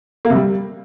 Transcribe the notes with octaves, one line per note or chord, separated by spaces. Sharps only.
A#3
C3
G3